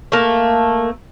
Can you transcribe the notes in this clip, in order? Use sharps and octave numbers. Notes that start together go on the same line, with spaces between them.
A3 A#3